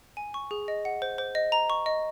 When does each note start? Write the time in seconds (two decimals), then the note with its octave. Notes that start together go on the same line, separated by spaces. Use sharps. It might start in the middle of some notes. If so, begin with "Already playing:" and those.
0.17 G#5
0.34 C#6
0.51 G#4
0.68 D#5
0.85 F#5
1.02 C5
1.18 C5
1.35 D#5
1.52 A#5
1.70 C#6
1.86 D#5